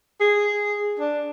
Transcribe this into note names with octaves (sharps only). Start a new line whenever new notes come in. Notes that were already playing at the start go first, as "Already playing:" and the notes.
G#4
D4